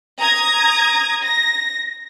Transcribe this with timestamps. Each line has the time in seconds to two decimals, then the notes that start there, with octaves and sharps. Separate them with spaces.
0.20 A#5 D#6 G#6 A#6
1.22 A#6